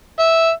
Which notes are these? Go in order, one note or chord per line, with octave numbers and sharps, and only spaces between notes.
E5